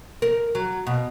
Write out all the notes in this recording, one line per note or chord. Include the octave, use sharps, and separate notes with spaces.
A#4
F#3
B2